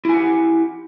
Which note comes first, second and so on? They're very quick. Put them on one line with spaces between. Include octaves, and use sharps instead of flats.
E4 G#5 F#5 G4